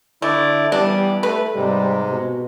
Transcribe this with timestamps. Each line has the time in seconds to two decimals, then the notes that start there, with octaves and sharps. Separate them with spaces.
0.22 D3 A3 E4 D5
0.72 E3 G3 B3 D4
1.23 A3 B4
1.55 G#2 C3 G3 G#3
2.09 B2